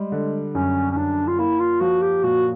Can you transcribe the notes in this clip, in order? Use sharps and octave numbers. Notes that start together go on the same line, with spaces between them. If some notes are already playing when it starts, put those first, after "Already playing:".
Already playing: G3 G#3
D3
F#2 C#4
C#4
F#2 D4
F4
A#3 E4
F4
F3 F#4
G4
A#2 F#4